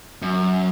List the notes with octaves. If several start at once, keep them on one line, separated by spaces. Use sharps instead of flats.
F#2